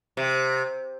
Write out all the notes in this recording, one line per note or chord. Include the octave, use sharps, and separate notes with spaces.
C3